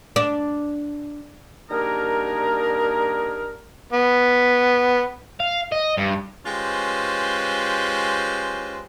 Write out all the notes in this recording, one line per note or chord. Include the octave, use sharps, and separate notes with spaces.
D4
D#3 G3 A#3 D4 G#4 A#4
B3
F5
D#5
G2
G#3 C#4 F4 G4 B4 C5